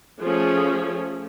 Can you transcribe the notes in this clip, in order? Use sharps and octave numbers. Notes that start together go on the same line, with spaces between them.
F3 A3 C#4 G#4